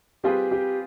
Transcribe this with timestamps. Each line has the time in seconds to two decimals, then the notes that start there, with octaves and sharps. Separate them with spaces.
0.24 G3 C4 F4 G4 G#4 B4
0.51 G4